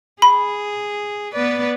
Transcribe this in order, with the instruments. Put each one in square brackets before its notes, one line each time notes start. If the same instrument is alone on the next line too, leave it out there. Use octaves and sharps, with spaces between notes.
[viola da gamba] G#4 [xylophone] B5
[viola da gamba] B3 B4 D5